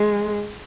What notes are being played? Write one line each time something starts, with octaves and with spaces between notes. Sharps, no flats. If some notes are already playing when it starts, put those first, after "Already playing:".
Already playing: G#3